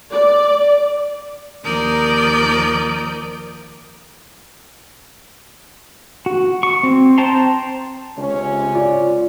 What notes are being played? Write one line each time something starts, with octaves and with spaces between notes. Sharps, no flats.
D5
D#2 F3 A#4 D5 D#6 G6
F#4
C#6
C4
C5 G5 A5 A#5 C6
C#2 C3 C#4
F4 D5